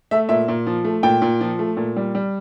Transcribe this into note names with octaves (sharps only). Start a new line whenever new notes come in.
A3 E5
A#2 E5
A#2
F3
A3
A#2 G5
A#2
F3
A3
A#2
G3
G3